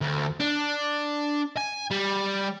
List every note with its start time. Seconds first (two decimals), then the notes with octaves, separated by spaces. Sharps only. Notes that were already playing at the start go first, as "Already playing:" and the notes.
0.01 D2
0.40 D4
1.58 G#5
1.91 G3